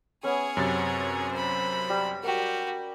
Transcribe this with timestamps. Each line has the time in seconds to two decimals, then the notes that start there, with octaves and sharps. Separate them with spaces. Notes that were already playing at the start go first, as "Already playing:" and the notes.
0.23 B3 C#4 G#4 C#5 E6
0.57 F#2 C3 A6
1.32 C5 B5
1.90 G3
2.23 F#4 G4 A#4 G5